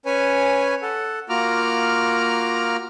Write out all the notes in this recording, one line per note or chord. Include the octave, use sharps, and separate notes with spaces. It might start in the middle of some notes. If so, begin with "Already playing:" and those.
C#4 B4 C#5 G#5
A4 F#5
A#3 F4 F#4 A#5 D6 F6